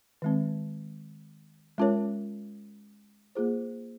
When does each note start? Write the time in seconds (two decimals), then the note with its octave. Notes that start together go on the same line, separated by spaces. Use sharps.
0.22 D#3 G#3 C4
1.78 G#3 C#4 F4 A#4 C#5
3.35 A#3 F4 G#4 C5